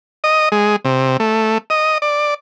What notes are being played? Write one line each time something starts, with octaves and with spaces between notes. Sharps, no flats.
D#5
G#3
C3
A3
D#5
D5